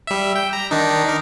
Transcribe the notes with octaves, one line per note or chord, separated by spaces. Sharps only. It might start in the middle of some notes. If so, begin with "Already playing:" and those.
G3 E5
G5
A#5
D#3 D4 D#4
D#4 A#4